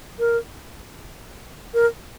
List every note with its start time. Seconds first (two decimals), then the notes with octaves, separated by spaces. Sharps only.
0.19 A#4
1.74 A#4